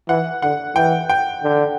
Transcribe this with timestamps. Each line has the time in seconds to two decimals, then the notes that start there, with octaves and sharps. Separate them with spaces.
0.09 E3 F#5
0.42 D3 F#5
0.76 E3 G5
1.10 G5
1.44 D3